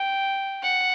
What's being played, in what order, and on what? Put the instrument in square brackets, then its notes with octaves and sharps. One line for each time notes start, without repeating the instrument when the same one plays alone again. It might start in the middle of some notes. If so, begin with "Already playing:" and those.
Already playing: [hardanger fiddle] G5
F#5